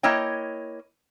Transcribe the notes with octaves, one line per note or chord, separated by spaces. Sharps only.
A#3 E4 C#5 D#5 G5